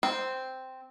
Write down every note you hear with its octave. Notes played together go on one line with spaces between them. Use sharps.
C4